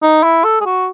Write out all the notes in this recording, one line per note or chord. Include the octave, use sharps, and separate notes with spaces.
D#4
E4
A4
G#4
F#4